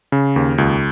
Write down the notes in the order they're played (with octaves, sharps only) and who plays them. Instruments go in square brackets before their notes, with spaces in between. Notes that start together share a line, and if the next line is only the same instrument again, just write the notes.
[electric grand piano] C#3
D#2
C#2